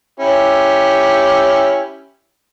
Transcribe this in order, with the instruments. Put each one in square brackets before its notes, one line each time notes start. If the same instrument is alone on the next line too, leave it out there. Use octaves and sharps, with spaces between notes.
[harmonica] C#4 E4 G4